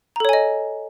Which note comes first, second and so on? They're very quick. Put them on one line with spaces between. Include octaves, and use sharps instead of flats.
A#5 A4 C#5 G#5 D#5